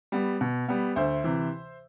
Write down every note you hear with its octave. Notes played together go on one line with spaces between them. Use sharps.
G3 B3
B2
G3 B3
D2 C5 E5
C3 E3